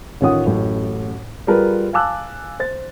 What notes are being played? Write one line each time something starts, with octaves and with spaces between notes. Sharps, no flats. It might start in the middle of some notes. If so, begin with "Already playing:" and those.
A1 D#3 C#4 F4 F#5 D#6
A1 F#2 A2
G3 F4 G#4 A#4 B4
F5 G#5 A5 D6 E6 F#6
C5 A6